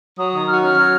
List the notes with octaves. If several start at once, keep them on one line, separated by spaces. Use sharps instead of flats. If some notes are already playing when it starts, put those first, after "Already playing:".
F#3 D#6
D#3 D#6
F#4 F6
C#4 F6
F#3